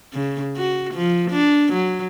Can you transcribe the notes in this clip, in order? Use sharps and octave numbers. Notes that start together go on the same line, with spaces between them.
C#3
F#4
F3
D4
F#3